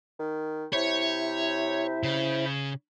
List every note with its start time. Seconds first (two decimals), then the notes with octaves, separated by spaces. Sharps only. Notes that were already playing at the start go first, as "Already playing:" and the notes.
0.19 D#3
0.73 C3 E4 C5 C#5 E5
2.03 C#3